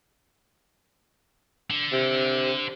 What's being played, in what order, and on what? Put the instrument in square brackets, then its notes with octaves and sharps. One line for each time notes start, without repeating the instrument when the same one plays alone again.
[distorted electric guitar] D3
[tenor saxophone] C3